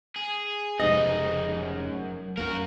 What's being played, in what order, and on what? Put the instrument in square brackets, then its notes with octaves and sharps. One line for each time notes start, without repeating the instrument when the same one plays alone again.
[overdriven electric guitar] G#4
[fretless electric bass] F1 G#2 C3 [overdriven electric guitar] C#2 D#4 [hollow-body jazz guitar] D#5
[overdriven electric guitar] B1 F#2
[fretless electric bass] F#2 A#3 [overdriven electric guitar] F#4 A#4